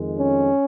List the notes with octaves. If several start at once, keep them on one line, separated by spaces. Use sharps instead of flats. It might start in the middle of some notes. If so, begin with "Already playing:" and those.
Already playing: F2 D#3 G#3
C#4